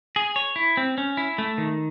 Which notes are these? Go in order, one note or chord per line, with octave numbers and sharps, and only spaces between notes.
G#4
C#5
E4
C4
C#4
E4
A3
D#3